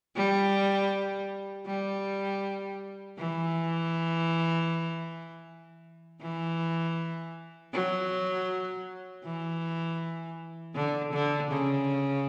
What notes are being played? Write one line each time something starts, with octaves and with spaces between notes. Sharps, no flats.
G3
G3
E3
E3
F#3
E3
D3
D3
C#3